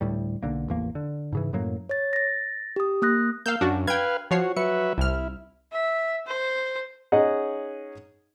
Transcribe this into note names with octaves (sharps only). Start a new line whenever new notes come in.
D2 A2 G3
B1 D3 A#3
A1 E2 A#3
D3
G#2 C#3 E3
F#2 A2 F#3 A#3
C#5 A6
A6 A#6
G4 D#6
A#3 D#6 F#6 A#6
A#3 F5 E6 G6
F#2 D4 F#4
B4 F5 G5 G#6
F3 F#4 C#5 C7
F#3 B4 E5 C#7
C2 E4 F6
E5
C5
C#4 D#4 G#4 D#5 F#5